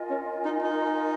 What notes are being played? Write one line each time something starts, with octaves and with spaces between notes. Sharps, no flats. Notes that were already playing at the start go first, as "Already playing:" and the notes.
Already playing: F4 A#4 D#5 G#5
C#4
D#4
D#4